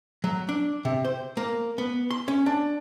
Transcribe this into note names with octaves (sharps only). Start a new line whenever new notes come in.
F#3
D4
C3
C5
A#3
B3
C6
C#4
D4